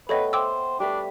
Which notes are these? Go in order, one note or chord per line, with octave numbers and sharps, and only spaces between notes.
A3 B3 A4 B4 C#5 D#5 G5
C5 G5 G#5 D6 E6
G3 A3 D4 B4